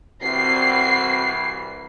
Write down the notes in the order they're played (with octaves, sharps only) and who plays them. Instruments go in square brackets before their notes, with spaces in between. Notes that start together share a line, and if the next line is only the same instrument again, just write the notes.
[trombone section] C2 E3 [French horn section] C4 F#4 [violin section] C7